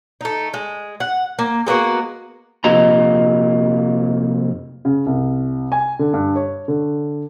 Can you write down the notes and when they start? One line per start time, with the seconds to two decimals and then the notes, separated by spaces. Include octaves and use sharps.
0.21 A3 D#4
0.54 G#3
1.00 F#5
1.39 A#3
1.67 G#3 A#3 B3 F#4
2.64 F2 C3 A#3 F4 D#5 A#5
4.85 C#3
5.06 C2
5.72 G#5
5.99 D3
6.13 G2
6.36 C#5
6.68 D3